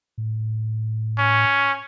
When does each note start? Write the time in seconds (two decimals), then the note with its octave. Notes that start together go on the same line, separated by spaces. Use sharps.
0.18 A2
1.19 C#4